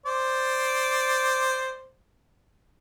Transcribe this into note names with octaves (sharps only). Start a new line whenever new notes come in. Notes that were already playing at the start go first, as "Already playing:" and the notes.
C5 D5